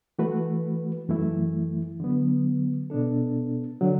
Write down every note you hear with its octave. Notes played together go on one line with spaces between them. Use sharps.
E3 A3 F#4 B4
F#2 E3 A3 E4
D3 F#3 B3
B2 B3 D4 A4
D3 F#3